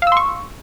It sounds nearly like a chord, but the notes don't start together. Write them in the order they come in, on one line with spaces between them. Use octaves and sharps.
F5 E6 C6 C#6